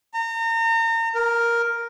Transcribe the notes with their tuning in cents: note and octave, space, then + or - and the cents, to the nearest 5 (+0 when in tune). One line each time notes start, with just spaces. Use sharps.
A#5 -35
A#4 +5